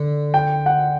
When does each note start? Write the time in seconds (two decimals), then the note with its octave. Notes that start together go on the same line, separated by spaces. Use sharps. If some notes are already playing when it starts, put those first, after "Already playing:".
Already playing: D3
0.34 G5
0.66 F#5